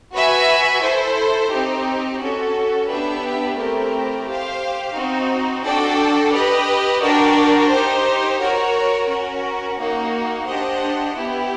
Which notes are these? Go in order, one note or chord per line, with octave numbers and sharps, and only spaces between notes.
F#4 B4 E5 G#5
E4 A4 C5
C4 D#4 G4
C#4 F#4 A4
B3 D4 G4 B4 E5
A3 C4 E4 G4 A#4
G4 C5 F5
C4 D#4 F#4
D4 F#4 A4 D5 G5
G4 B4 D#5
D4 F#4 A#4 D5 G5
D#4 G4 C5
F#4 A#4 C#5
C#4 F#4 A#4
A#3 D#4 F#4
D4 G4 C5 D#5 F#5
B3 E4 G4